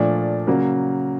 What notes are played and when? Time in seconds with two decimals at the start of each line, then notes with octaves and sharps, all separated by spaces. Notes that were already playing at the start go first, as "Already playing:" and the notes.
Already playing: A#2 F3 A3 D4
0.47 C#3 F#3 A#3